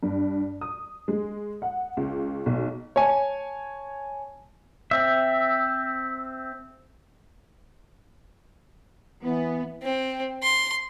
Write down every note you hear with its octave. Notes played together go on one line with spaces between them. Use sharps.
G2
D#6
G#3
F#5
C#2
B1
C#5 G#5 A5
C4 E5
E3 B3
C4
C6